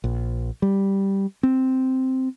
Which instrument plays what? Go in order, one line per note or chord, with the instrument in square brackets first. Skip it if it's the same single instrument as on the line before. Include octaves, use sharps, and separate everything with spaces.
[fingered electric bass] A#1
G3
C4